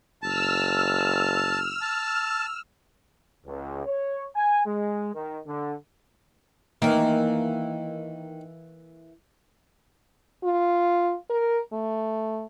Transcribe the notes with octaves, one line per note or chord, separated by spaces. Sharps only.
F#1 A5 E6 F6
A5
C#2
C#5
G#5
G#3
D#3
D3
D#3 E3 A#3
F4
A#4
A3